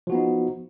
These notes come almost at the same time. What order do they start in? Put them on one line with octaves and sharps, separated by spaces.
F3 F#4 B3 D#4